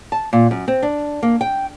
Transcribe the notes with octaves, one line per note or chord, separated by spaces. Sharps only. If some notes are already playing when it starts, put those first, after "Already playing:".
A5
A#2
F#2
C4
D4
A#3
G5